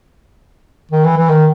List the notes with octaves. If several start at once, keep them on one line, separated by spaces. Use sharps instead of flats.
D#3
E3
E3
D#3